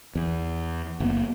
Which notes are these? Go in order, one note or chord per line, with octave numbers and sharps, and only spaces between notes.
E2
F#1 A#3 B3